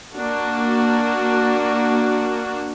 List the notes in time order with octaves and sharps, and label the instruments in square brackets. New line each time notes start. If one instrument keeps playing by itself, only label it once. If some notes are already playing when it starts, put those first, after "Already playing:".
[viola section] A#3 D4 F#4